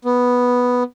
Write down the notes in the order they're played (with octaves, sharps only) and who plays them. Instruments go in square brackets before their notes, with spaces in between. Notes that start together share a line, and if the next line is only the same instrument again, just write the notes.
[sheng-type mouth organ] B3